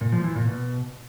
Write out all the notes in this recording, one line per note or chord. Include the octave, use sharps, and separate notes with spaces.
A#2
F3
E3
A#2
B2